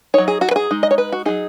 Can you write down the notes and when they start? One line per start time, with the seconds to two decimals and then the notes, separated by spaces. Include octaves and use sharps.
0.14 F#3 D#4 C#5
0.28 G#4
0.41 F#4
0.51 B4
0.56 G#4
0.71 G#3 D#4
0.83 D#5
0.91 C#5
0.98 B4
1.12 F#4
1.25 F#3 D#4 G#4